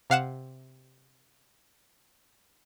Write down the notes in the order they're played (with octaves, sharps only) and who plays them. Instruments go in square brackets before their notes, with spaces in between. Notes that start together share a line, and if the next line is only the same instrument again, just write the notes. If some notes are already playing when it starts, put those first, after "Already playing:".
[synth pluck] C3 F5 F#5 E7